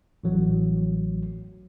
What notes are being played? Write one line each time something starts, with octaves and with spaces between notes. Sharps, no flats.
A1 F#3